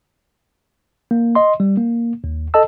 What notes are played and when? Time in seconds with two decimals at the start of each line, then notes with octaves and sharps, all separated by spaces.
1.11 A#3
1.35 D#5 C6
1.60 G3
1.77 A#3
2.24 D#2
2.54 A4 D#5 A5 E6